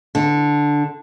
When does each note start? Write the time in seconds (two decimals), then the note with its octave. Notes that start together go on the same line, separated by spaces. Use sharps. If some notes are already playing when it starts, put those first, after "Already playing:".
0.15 D3